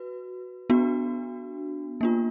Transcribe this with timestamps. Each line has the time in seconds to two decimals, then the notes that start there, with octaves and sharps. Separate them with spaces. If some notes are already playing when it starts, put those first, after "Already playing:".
Already playing: F#4 B4
0.70 B3 D4 F#4
2.01 A#3 D4 F4